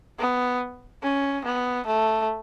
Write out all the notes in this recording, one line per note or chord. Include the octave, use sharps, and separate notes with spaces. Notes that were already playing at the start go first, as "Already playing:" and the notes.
B3
C#4
B3
A3